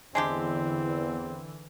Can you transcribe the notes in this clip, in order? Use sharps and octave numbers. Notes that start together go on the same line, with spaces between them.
E2 D3 E3 G#3 C4 D4 G4